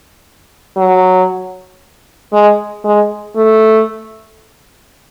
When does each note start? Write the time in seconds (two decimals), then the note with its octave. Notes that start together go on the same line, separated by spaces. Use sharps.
0.77 F#3
2.33 G#3
2.84 G#3
3.36 A3